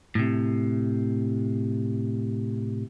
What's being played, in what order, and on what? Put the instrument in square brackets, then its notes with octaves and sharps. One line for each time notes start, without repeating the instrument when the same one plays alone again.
[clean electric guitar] A2 C3